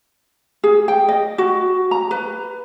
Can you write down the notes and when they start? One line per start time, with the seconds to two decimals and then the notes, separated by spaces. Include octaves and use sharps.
0.64 G#4
0.88 G5
1.09 D#5
1.38 F#4
1.91 A#5
2.11 B4